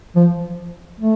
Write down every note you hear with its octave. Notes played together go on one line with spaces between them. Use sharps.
F3
A3